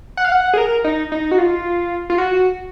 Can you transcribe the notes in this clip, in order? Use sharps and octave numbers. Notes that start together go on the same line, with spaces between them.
F#5
F5
F#5
G#4
A#4
D#4
D#4
F#4
F4
F4
F#4